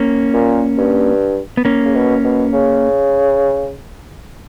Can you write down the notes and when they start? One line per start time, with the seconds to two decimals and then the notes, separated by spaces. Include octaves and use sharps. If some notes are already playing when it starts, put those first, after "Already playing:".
Already playing: A#3 C#4
0.34 A#2
0.78 G2
1.57 B3
1.65 A#3 C#4
1.85 C#3
1.94 B2
2.24 B2
2.53 C#3